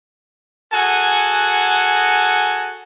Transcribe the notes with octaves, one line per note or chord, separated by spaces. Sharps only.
F#4 G#4 A4 F#5 G#5